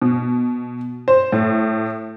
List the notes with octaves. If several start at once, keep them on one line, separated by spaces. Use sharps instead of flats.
B2
C5
A2